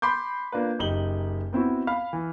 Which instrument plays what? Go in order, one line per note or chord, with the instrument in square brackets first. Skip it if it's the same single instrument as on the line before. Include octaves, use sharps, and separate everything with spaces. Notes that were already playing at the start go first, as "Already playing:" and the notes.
[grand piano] B5 C6 D6 G6
A#3 D4 F4 B4
F#1 D#4 G4 F#7 G7
B3 C4 E4 F#4
F5 B5 F6
E3